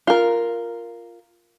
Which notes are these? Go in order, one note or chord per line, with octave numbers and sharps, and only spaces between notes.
F4 A#4